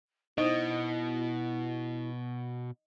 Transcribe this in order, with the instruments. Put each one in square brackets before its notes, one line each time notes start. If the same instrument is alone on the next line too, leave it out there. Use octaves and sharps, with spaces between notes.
[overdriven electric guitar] B2 [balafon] D#4 C5 [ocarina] E4 [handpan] D#5